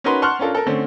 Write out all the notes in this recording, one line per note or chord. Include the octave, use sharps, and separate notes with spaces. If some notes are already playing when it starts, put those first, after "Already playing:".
C#4 D#4 F#4 A#4 B4 C6
F#5 A5 C6 C#6 F6 F#6
C#4 D4 F4 A4 A#4
A4 A#4
D3 A3 C4 C#4